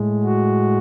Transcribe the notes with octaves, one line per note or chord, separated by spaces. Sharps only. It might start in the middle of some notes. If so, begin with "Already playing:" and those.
Already playing: A2 G#3
F#4